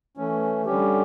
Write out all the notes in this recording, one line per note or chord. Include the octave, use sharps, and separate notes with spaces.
E3 A3 C#4
D3 G3 C#4 G4